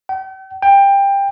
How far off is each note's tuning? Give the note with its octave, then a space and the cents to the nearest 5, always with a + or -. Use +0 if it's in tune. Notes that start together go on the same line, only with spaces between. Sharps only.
G5 -40
G5 +20